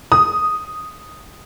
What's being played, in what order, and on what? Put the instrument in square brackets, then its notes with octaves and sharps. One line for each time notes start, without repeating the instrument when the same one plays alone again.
[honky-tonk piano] D#6